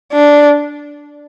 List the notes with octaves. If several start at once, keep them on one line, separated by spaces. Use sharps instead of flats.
D4